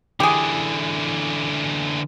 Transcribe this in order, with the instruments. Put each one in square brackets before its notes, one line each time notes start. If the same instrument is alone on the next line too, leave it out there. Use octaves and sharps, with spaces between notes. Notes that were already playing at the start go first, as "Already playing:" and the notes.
[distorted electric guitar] D3 E3 [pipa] G4 G#4